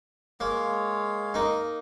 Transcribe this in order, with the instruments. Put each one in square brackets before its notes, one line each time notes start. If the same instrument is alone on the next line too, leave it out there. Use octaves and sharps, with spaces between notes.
[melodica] G#3 C#5 F5 [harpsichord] A#3
[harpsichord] A#3 D#4